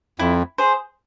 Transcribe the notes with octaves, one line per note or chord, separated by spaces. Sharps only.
F2 E4
G#4 C5